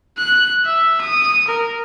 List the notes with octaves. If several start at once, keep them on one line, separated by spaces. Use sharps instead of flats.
F#6
E5
D#6
A#4